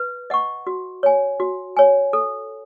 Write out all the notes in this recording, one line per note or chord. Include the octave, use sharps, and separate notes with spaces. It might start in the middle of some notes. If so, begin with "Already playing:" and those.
Already playing: B4
D#5 F#5 C#6
F#4
C#5 G#5
F#4
C#5 G#5
A4